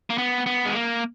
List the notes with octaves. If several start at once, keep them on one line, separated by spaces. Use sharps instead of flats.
A#3
B3
B3
G#3
A#3